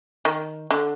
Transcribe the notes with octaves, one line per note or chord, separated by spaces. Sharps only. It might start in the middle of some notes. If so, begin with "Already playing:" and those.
D#3
D3